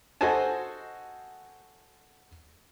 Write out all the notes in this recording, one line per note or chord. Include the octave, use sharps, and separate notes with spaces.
F#4 A4 C5 D#5 G#5 A5